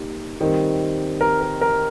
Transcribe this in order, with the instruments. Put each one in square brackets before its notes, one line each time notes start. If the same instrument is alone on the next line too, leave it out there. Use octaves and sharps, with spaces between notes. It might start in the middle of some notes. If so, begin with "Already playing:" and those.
Already playing: [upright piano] G3 A#3 D#4 G4
D#3 G3 C4
[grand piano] A#4
A#4
A#4